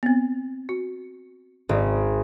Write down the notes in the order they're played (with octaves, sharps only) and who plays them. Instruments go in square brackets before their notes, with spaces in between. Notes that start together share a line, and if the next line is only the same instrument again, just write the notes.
[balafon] B3 C4
F#4
[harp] G#1 [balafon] A4 D5